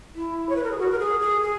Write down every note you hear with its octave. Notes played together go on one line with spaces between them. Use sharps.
E4
C#5
B4
A#4
G#4
F#4
A#4
G#4
G#4
G#4